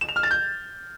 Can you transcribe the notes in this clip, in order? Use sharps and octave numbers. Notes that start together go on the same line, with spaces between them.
E7
F7
F6
A6
G6